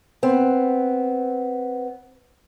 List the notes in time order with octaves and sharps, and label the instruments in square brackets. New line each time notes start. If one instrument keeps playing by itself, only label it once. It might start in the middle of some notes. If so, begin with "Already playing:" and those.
[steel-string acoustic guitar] B3 C4